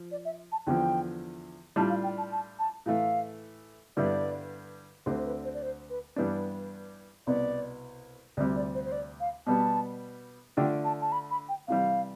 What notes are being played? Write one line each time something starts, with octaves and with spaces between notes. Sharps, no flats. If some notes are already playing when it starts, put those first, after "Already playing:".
Already playing: F3
D5
E5
A5
E2 D3 F3 G5
A2 G3 D4 F4 A5
F5
G5
A5
A5
A5
A2 E3 A3 F5
G2 D3 G3 B3 E4 D5
D2 D3 A3 C4 C5
B4
C5
D5
C5
B4
G2 E3 G3 B3 D4
C2 B2 B3 D5
D2 C3 G3 D5
D5
C5
C5
D5
F5
B2 G3 B3 A5
D3 A3 D4 F4 G5
A5
A5
B5
B5
G5
C3 E3 G3 F5